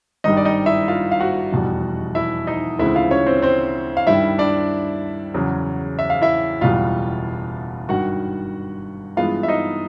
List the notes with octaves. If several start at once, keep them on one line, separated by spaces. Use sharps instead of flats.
G#1 G2 D#3 G3 D#4 D#5
D5
D#4 D#5
E4 E5
F4 F5
F5
F#4 F#5
F1 E2 B2 G3
E4 E5
D#4 D#5
D2 C#3 E3 G#3 C4 E4 E5
F4 F5
C#4 C#5
C4 C5
C4 C5
F5
G2 D#3 G3 E4 E5
D4 D5
E2 C#3 F#3
E5
F5
E4 E5
F#1 E2 B2 G3 F4 F5
G#1 G2 D#3 F#4 F#5
G2 E3 G#3 B3 F4 F5
E5
D#4 D#5